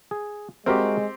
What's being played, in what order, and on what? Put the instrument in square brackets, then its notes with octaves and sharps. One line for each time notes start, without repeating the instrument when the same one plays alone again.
[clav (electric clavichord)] G#4
[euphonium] G#3 [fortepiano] C4 G4 [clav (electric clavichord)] F#4 A#4 E5